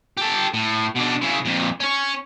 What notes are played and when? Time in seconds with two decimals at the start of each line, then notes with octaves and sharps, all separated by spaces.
0.17 G4 A4
0.54 A2
0.95 B2 D4
1.21 C#3 E4
1.45 F2 A#2
1.80 C#4 C#5